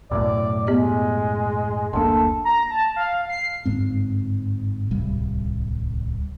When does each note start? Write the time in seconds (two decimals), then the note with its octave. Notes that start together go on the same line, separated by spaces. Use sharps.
0.11 B1 F#2 A2 D5
0.67 G#3 B3 G4 D#5
1.93 F#1 D2 A#3 D4 A4 C6
2.45 A#5
2.70 A5
2.96 F5
3.29 C7
3.65 G1 G#2 C4
4.91 D1 C2 G3